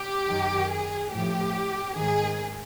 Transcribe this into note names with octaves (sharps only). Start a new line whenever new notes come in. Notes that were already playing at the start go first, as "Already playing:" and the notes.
Already playing: G4
F#2 D#3
G#4
A2 F3 G4
G#2 D#3 G#4